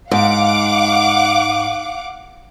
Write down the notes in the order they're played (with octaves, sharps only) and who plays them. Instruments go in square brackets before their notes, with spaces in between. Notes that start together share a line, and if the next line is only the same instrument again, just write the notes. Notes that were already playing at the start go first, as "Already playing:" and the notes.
[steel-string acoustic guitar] G#2 [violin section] F5 F#5 D6